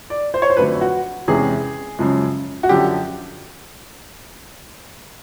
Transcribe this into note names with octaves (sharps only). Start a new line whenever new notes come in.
D5
C5
C#5
C5
F2 D3 F#3 A3 B4
F#4
E2 C3 E3 G#3 C#4 G#4
F#2 C#3 F3 G#3
F#4
F#2 D3 F3 G4